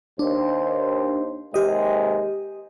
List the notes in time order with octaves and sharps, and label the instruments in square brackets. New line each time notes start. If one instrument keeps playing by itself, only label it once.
[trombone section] D#2 C5 [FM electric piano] D4
[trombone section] D#2 C3 G#3 [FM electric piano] G4 D#5